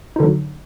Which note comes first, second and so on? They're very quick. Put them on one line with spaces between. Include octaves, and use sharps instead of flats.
D#4 D3 F#3